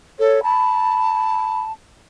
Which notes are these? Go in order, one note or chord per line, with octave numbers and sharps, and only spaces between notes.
A4 C#5
A5 B5